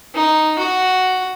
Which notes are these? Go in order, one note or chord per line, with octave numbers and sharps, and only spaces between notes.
D#4
F#4